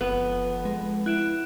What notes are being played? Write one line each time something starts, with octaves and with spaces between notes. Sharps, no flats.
F#1 F2 B3
G#3
E4 F#6 D7 E7